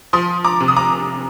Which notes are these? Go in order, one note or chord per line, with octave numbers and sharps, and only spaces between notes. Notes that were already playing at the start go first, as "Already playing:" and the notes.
F3 C6 D#6
A#5 D6
C3
D#6
A#5 D6